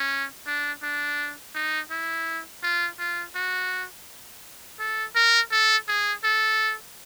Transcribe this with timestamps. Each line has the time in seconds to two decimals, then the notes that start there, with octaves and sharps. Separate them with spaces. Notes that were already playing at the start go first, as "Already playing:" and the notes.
Already playing: C#4
0.47 D4
0.83 D4
1.55 D#4
1.91 E4
2.63 F4
2.99 F4
3.35 F#4
4.80 A4
5.16 A#4
5.52 A4
5.88 G#4
6.24 A4